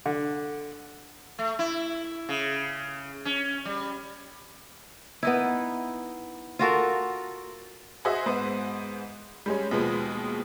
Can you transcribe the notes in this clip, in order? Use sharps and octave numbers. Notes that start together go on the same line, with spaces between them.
D3
A3
E4
C#3
C#4
G3
B3 D#4 E4
F4 F#4 A4 A#4
F#4 G#4 C5 D#5 E5
G#2 B3 C5
G3 G#3 C#4
D#2 B2 F3 G#3 B3